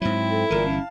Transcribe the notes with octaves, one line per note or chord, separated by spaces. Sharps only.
G#2 F#3 C4 E4
A4
G1 A#2 E3 A#4
C#4 F5 A5